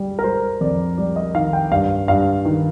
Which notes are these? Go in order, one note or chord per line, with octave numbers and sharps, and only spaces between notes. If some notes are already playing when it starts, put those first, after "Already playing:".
Already playing: G3
A#4
G3 C5
F2 D5
G3 D5
D#5
D#3 F5
G5
G2 F5
G2 F5
D#3